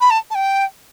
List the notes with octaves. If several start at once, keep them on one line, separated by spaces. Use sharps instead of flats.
B5
A5
A5
G5